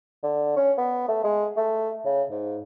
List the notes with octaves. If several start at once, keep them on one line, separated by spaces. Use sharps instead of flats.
D3
C#4
B3
A3
G#3
A3
C#3
G#2